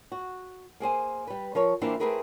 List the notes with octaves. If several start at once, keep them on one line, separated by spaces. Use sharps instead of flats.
F#4
A#3 G#4 C5 G#5
G3 B4
F3 A#4 C#5
E3 A#3 C4 D4 E4 F4
A3 C4 E4 G#4 A#4 B4